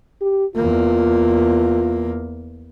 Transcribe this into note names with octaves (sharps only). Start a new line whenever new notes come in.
G4
E2 A#3 F4